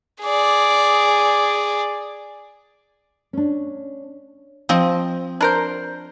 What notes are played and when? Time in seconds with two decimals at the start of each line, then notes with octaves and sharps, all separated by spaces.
0.23 G#4 D5
3.33 C#4 D4
4.69 F3 C4 D#5
5.41 D4 A#4 C5